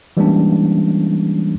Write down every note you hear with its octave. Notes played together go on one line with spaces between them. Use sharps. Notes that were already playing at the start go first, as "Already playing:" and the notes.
E3 G3 G#3 A#3 C#4 D4